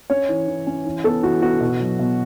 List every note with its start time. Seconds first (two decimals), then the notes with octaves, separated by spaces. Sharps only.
0.10 C#4 C#5
0.29 E3
0.48 E3
0.67 C#4
0.85 E3
1.04 B3 A4
1.23 E3 F#4
1.42 B3 F#4
1.61 B2
1.80 F#3
1.99 B2